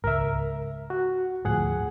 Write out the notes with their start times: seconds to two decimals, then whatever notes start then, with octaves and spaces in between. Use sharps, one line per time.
0.04 C#2 G#2 A#4 E5
0.90 F#4
1.45 D2 G#2 F3 A3 G#4 F#5